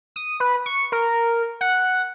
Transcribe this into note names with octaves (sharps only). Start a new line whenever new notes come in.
D#6
B4
C#6
A#4
F#5